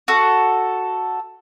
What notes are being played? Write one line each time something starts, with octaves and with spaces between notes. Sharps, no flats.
F#4 A4